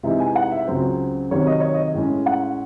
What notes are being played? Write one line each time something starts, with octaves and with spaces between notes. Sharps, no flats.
C3 E3 G#3 D#4 E5
G#5
F#5
E5
C#2 C#3 F#3 C4 C5
C3 D#3 F#3 C4 C#5
D#5
C#5
D#5
A2 G#3 C#4
F#5